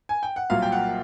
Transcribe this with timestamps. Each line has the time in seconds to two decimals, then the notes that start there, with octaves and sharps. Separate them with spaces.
0.09 G#5
0.23 G5
0.36 F#5
0.50 C2 A#2 F#3 F5
0.62 G5
0.72 F#5